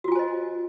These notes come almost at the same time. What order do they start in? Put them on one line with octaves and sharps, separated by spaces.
F#4 F4 G#5 C5 D#5